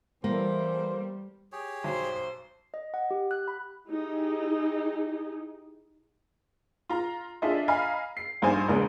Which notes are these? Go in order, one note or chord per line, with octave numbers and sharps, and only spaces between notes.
E3 G3 A#3 A4 C5
G4 G#4 C#5
B1 C5
D#5
F#5
G4
F#6
B5
D#4 E4 G4 G#4
F4 A#5
D4 F4 G#4 A4 D#5 E5
D#5 F5 G#5 A#5 B5
C7
A#1 G2 D#4 C5 G#5 D#6
A#1 E2 C#3 G#3 B3 D#6